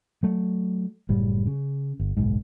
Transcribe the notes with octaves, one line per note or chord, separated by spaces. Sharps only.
F#3 A3
F#1 A2 G3
C#3
G1
F#1 B1 G#2